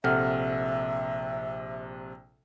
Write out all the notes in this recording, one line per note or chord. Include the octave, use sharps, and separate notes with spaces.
A#1 C3 A4 E5 F#5 F6